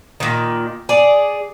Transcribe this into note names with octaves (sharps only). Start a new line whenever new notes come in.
A#2 D#3
G#4 D5